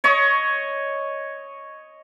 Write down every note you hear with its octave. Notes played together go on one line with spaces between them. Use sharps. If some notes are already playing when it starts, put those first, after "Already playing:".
C#5 D#5 C#6